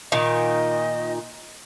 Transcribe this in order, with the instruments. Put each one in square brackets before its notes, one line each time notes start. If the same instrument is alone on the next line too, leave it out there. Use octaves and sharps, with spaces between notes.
[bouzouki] A#2 D#3 [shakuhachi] D#5